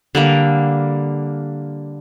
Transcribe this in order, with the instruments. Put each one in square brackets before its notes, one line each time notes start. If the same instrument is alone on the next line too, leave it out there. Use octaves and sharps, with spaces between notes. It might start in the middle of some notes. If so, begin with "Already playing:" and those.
[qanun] D3 G3 A#3